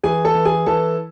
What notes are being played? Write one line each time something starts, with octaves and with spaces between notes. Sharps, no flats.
E3 G#4 G#5
A4 A5
E3
G#4 G#5
E3 A4 A5